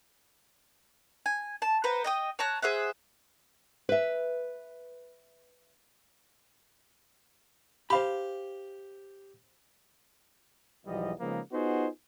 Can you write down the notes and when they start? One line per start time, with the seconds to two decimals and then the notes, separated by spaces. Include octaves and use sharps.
1.26 G#5
1.62 A5
1.84 B4 C5 F#5 A#5
2.04 D#5 G5 D#6
2.39 C#5 A5 A#5 F#6
2.62 G#4 C5 E5 F#5
3.89 B4 E5
7.90 G4 C5 F5 B5
10.86 B1 E2 F3 G3 D#5
11.20 C#3 F3 G#3 A#3 B3 D#4
11.53 B3 D#4 F4 F#4 G#4 C5